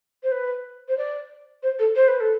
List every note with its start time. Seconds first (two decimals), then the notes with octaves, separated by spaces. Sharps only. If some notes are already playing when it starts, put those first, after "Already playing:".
0.23 C5
0.31 B4
0.88 C5
0.97 D5
1.62 C5
1.79 A4
1.95 C5
2.08 B4
2.20 A4